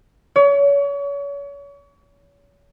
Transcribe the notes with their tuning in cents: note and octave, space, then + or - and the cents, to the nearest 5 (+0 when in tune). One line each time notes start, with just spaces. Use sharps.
C#5 +35